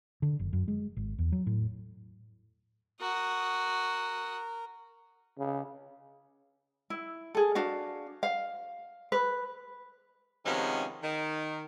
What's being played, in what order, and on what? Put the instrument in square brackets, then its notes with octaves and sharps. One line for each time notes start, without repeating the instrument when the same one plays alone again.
[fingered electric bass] D3
F#1
F#2
G#3
G#1
E2
F#3
A2
[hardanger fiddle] F#4 D#6 [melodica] A#4
[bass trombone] C#3
[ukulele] E4
G#4 A4
D4 F#4 F5
F5
B4
[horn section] C3 D#3 F3 G#3 B3 C#4
D#3